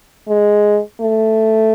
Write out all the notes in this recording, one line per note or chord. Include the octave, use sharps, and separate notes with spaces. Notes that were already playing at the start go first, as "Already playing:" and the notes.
G#3
A3